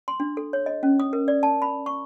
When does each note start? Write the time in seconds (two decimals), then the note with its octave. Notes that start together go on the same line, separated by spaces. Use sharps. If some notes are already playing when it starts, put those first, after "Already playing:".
0.08 C6
0.20 D4
0.37 A4
0.53 C#5
0.66 D#5
0.83 C#4
1.00 D#6
1.13 A#4
1.28 D5
1.43 A5
1.62 B5
1.86 C#6